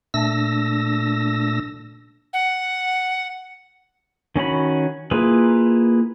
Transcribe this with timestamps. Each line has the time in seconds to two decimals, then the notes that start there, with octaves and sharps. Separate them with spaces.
0.14 A#2 A3 D4 E6 A#6
2.33 F#5
4.36 D#3 C#4 F#4 B5
5.11 A#3 E4 F4 G#4 B4